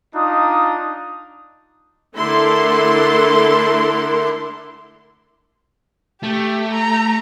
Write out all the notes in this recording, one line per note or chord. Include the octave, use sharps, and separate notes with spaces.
D4 D#4 F4 D#6
D3 A3 E4 A4 A#4 C6
A3 G4
A#5